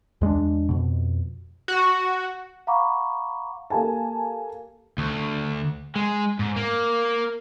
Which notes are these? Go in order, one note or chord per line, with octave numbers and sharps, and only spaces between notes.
E2 G#3 A3 D4
F2 B2
F#4
F5 F#5 A#5 B5 C#6 D6
A#3 G4 A4 G#5 A5
D2
G#3
G#2
A#3